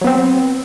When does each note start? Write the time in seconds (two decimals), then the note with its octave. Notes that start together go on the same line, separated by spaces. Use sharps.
0.01 F#3
0.04 B3
0.07 C4